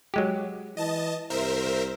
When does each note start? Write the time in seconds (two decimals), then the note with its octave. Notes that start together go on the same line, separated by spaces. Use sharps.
0.14 F#3 G#3 G4
0.77 E3 D#5 A5
1.30 C2 A#4 C5 E5